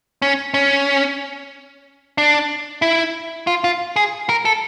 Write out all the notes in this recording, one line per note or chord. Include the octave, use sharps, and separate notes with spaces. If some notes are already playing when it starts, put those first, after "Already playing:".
C#4
C#4
D4
E4
F4
F4
G#4
A#4
A4